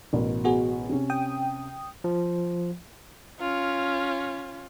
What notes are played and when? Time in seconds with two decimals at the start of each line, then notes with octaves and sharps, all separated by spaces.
0.13 A1 B2 A#4
0.44 B3 F#4 G#4
0.90 C3 C#4
1.10 G5 D#6
2.04 F3
3.40 C#4 F4